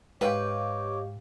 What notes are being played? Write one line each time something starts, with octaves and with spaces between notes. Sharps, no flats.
G#2 G4 B4 C#5 D#5 F5 G5 D6